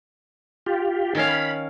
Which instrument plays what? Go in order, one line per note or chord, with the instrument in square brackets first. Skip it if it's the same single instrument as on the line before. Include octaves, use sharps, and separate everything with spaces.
[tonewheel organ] F4 G4
[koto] D#3 C#4 F5
[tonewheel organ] B5